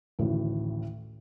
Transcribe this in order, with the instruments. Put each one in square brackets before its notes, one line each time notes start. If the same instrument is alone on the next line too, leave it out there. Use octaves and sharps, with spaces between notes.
[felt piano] A1 D2 A2 D#3